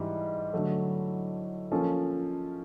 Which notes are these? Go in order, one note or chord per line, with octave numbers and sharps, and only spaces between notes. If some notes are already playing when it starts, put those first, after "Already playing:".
Already playing: G#2 E3 G3
D3 F#3 A3
F3 A#3 C#4 F4 A4